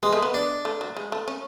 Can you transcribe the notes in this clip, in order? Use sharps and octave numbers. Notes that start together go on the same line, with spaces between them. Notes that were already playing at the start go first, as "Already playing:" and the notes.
G#3 B3
A3
B3
D4
A3
F#3
G#3
A3
C#4